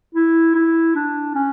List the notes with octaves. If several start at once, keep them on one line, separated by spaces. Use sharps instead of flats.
E4
E4
D4
C#4